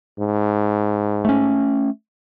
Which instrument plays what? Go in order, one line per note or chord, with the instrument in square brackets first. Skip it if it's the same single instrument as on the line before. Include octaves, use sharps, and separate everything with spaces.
[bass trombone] G#2
[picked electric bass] A3 C#4